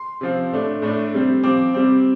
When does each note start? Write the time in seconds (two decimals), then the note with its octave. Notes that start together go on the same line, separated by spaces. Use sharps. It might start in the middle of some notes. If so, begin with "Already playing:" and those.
Already playing: C6
0.21 C3 F3 C4
0.52 A2 A3 D4
0.82 A2 A3 D4
1.14 C3 G3 C4
1.44 F3 C4 D6
1.74 C3 G3 C4